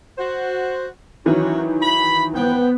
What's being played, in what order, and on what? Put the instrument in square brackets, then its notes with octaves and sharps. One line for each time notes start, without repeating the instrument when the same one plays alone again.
[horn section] F#4 C5
[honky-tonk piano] D#3 E3 F#3 [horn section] C#4 F#4
[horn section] B5
[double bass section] B3 [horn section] B4 C5 G5